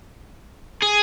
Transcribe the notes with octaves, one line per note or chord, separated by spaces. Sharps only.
G#4